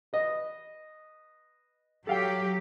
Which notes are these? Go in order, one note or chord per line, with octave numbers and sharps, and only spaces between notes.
B4 D#5
F#3 G4 A4 F5 G5